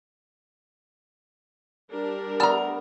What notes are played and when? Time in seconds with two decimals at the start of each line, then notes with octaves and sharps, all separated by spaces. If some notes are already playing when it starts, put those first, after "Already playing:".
1.90 G3 D4 A#4
2.40 A3 B3 D5 A5 A#5 E6 F6